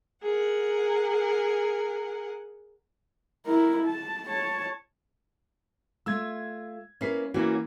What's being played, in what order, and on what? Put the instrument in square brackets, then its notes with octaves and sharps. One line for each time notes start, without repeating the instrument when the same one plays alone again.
[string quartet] G#4 A#4 F#5
[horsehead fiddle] E4 A#4
A5
C#5 A5
[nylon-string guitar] A3 F4 [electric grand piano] E6 G#6
[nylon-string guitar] A#3 E4 B4 [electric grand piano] C#4 C7
[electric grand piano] E3 A#3 E4 [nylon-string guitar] C#4 F#4